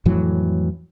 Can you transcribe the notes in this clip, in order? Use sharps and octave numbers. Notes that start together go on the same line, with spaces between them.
F2 A2 E3 F#3